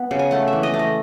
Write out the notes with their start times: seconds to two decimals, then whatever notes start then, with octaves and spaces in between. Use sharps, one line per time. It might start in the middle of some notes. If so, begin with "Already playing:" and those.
Already playing: B3
0.11 C#3
0.19 G#5
0.31 A3 F#5
0.48 E5
0.53 E3
0.63 D#5
0.74 A3
0.79 D#5